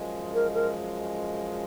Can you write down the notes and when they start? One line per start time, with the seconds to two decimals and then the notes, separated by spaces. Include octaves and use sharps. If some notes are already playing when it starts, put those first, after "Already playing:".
Already playing: F#2 F3 G#3
0.34 A#4
0.54 A#4